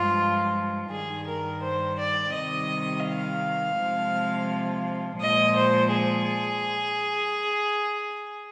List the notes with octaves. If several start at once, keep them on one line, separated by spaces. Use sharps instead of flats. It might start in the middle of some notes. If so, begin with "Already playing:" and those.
Already playing: G2 F3 G#3 F4
G2 D#3 G3 G#4
A#4
C5
D5
C3 D#3 G3 D#5
F5
C3 F3 G#3
A#2 F3 G#3 D#5
C5
G#4